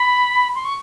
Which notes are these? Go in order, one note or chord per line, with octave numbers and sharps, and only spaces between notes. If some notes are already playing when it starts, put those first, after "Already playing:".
Already playing: B5
C6
C#6